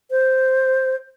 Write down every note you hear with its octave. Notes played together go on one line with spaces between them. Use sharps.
C5